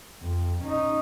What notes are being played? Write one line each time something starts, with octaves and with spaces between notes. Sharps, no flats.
F2
C#4 D#4